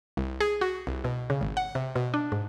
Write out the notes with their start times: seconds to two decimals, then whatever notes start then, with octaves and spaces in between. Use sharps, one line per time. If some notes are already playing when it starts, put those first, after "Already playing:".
0.17 C2
0.40 G#4
0.61 F#4
0.87 C2
1.04 B2
1.30 C#3
1.41 G#1
1.57 F#5
1.75 C3
1.96 B2
2.14 D4
2.32 G#2